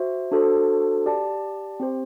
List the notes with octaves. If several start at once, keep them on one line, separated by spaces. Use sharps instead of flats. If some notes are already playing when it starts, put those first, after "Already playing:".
Already playing: F#4 C5 E5
D4 F#4 A4 C5
G4 D5 A5
C4 G4 C5